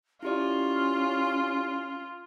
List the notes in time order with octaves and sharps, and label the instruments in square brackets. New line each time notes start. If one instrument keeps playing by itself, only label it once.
[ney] C#4 [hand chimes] E4 G4 D5 [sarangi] F4